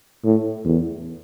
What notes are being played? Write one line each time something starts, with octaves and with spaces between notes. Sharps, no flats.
A2
E2